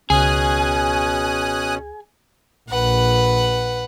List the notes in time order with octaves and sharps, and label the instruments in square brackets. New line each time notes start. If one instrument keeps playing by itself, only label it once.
[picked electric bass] C#2 [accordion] B2 C#4 [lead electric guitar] G#4 [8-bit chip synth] G#5 D#6 F#6
[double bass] A#1 [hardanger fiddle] B4 F#5